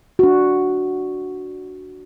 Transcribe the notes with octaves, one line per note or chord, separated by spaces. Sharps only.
D4 F#4